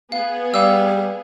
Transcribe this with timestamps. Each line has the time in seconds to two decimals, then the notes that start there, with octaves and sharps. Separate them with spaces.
0.12 B3 G#4 F5
0.54 G3 F5 E6